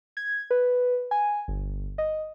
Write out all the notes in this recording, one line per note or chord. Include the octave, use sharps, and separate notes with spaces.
G#6
B4
G#5
G1
D#5